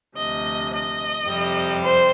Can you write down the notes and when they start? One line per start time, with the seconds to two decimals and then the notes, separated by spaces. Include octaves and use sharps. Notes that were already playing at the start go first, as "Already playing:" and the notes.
0.17 D2 C3 F3 D#5
0.72 D#5
1.26 F2 C3 G3
1.81 C5